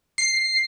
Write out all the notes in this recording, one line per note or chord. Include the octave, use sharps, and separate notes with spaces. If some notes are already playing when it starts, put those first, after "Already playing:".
C7